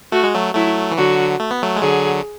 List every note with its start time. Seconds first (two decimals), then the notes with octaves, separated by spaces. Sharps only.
0.12 A3 F#4
0.24 G#3
0.35 F#3 A3
0.55 F#3 A3 E4
0.91 E3
0.98 D3 F#3 F#4
1.40 A3
1.51 B3
1.63 F#3 A3
1.76 G#3
1.82 D3 F#3 G#4